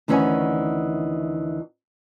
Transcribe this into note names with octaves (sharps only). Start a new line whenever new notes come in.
D2 D#3 E3 C#4 F#5 G#5